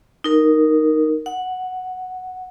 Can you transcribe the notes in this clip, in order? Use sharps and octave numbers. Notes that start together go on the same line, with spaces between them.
D#4 A#4
F#5